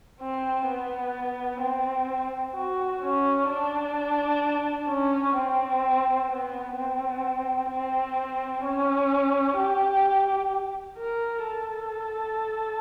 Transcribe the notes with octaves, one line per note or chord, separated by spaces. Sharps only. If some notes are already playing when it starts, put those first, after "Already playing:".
C4
B3
C4
F#4
C#4
D4
C#4
C4
B3
C4
C4
C#4
G4
A#4
A4